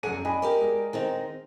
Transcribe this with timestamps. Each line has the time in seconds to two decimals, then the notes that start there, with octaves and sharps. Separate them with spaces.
0.03 F#2 D4 G#4 F#5 D#7
0.25 D4 D#5 G#5 B5
0.42 G4 A#4 D5
0.61 G#3
0.93 D#3 C4 D#4